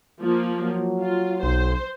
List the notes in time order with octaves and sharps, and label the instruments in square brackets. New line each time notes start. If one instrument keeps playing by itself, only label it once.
[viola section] F3 A#3
[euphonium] F#3
[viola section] F4
[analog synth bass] B1 [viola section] C5